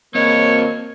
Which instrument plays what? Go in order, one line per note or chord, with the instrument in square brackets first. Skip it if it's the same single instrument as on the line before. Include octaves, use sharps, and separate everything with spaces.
[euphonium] A#3 [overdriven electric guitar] C4 D#5 [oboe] C#5